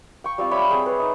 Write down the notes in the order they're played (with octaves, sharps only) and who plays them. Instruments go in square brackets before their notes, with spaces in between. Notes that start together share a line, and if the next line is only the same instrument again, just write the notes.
[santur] G5 C#6
G3 C4 F4
C#5 D5 E5 B5
C4 G#4
B4 C#5 E5
D#4 D#5